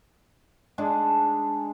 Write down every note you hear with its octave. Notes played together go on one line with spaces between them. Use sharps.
G#3 D4 G#4 A4